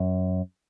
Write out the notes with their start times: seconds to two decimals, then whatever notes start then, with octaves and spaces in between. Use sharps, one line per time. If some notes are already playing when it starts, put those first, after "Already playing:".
Already playing: F#2